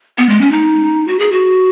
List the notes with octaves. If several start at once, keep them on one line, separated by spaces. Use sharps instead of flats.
B3
G#3
C#4
D#4
F#4
G#4
F#4